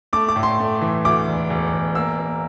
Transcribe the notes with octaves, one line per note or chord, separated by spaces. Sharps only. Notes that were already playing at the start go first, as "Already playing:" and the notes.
A3 D6
D6
A2
C6
A3
E3
D2 D6
E1
E1
E1
A#3 E6
A#3